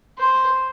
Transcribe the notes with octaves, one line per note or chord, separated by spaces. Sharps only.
C5